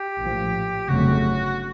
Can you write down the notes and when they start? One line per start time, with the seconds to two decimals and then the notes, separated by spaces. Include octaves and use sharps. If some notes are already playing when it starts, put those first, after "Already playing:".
Already playing: G4
0.19 A#1 A2 F3
0.88 G1 F2 C#3 F#3 A3 F#4